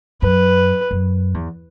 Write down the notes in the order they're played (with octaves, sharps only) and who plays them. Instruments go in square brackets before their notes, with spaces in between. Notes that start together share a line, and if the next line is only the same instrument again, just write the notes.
[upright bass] F#2 [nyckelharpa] B4
[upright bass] F#2
E2